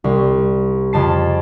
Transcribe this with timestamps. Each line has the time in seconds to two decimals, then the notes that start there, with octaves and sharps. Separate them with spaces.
0.04 C2
0.93 F2 C#3 A5 C7